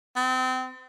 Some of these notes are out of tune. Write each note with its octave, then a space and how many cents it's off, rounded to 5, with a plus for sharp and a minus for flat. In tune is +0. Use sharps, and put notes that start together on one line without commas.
C4 -30